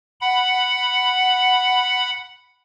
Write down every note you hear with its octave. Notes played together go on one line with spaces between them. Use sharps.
F#5 B5